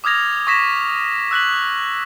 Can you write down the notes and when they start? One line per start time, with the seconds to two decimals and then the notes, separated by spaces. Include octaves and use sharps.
0.04 D6 D#6 F6 G#6 A#6 F7
0.47 C#6 D#6 A#6 B6 E7
1.31 E6 F#6 B6 F#7